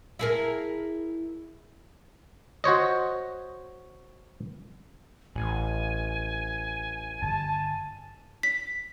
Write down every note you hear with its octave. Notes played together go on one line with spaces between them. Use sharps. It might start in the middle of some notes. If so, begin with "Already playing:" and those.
E4 G#4 A#4
F#4 C5 C#5 D#5
A1 G#5
G1 A5
B6